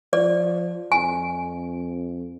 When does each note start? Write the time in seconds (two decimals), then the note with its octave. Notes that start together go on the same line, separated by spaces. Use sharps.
0.13 F3 D5
0.92 F2 G#5